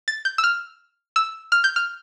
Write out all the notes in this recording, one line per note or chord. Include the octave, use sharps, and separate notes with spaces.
A6
G6
E6
F6
E6
F6
G6
F6